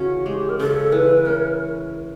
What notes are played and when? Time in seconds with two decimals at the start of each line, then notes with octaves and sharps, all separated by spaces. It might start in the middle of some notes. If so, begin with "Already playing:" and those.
Already playing: C#3 E3 C#4 F#4
0.25 G#3 G4
0.49 A#4
0.59 C#3 A4
0.92 E3 B4
1.25 C#4 A#4